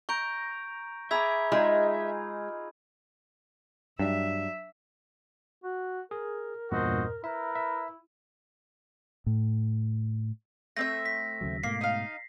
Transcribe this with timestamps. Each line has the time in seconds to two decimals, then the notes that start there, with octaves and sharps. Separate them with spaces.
0.09 A#5 C#6 G6 D7
1.11 G#4 E5 A#5 B5 D6 E6 G#6
1.52 G#3 D#4 F4 G#5
3.99 G2 F#3 D4 E5
5.64 F#4
6.11 G#4 A#4
6.72 E2 G2 A#2 F#4 C5 D#5
7.24 E4 A#4 B4 E5 B5
7.55 E5
9.26 A2
10.77 A3 C4 E5 A#6
11.06 B6
11.41 D#2 C#3 F#3
11.63 G#2 B2 A3 A#3 C7
11.81 D#4 F5